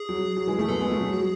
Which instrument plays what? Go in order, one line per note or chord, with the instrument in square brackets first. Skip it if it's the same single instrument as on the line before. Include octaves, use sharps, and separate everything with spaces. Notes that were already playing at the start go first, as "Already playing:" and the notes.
Already playing: [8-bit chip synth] G#4
[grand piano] F#3
F#3
E3 G#3
[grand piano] F#3 A3 [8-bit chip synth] G#4
[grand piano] G#3 B3 [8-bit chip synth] A4
[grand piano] G#3 B3 [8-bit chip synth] G#4
[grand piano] F#3 A3
F#3
F#3